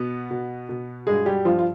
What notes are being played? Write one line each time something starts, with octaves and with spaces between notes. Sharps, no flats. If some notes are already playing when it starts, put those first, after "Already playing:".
Already playing: B2 B3
B2
B2
G2 G#3 G#4
G3 G4
G2 F3 F4
F4